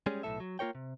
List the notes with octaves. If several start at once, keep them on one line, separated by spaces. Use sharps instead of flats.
G3 G#3 C#4 G#4
B1 A2 A4 E5
F#3
A#3 F4 A#4 C#5 G5
C3